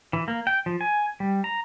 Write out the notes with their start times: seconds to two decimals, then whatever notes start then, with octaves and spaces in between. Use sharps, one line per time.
0.13 E3
0.28 A#3
0.47 G5
0.66 F3
0.81 G#5
1.20 G3
1.44 A#5